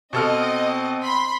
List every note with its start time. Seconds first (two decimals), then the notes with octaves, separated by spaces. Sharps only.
0.13 B2 C4 A4 D#5 F6
1.03 B5 C6